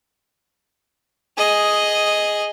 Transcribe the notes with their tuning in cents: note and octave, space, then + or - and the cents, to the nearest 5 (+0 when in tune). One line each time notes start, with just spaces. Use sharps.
G#4 +0 D#5 +0